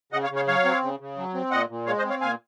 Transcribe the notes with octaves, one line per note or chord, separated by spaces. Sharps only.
C#3 D#5 F#5
C#5 F5
C#3
C#5 F5
F#3 C#5 F5
C4
C#3
C#3
F#3
C4
A#2 D#5 F#5
A#2
G#3 C#5 F5
C5 D#5
C4
C#5 F5
A#2 F5 G#5